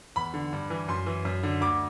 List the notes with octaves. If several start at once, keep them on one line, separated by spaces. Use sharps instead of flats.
E2 B5
D3
G2
E3
F#2 C6
E3
F#2
D3
D2 D6